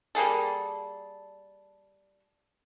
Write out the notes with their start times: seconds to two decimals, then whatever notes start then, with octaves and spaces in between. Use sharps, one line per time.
0.15 G3 A#3 G#4 A4